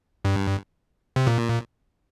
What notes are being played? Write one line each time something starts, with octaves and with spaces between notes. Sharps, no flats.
G2
C3
A#2